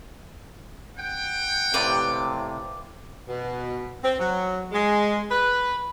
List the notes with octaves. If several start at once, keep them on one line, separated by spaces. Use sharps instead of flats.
F#5 G5
A2 C3 B4 D5 F5
B2
C4
F#3
G#3
B4